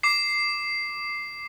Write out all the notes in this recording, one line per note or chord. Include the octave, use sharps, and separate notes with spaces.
D6 C7